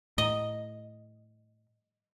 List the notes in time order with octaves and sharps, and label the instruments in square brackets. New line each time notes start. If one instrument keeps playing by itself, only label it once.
[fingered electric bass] A2 [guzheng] D#5